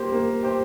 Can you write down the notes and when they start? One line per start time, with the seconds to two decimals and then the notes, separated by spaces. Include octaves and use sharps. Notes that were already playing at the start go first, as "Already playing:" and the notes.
Already playing: A#3 G4 C5
0.12 A#3
0.43 G4 C5